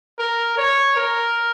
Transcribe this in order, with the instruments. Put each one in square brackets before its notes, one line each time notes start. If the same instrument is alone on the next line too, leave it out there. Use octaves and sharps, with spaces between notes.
[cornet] A#4
C#5
A#4